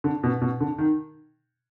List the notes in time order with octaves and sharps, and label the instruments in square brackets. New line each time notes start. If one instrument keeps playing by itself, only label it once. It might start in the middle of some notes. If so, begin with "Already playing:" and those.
[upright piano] D3
B2
B2
D3
D#3